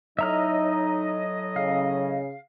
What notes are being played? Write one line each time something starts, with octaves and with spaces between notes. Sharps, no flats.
A2 F#3 D#4 D#5 E5 A#5 F6
C#3 F5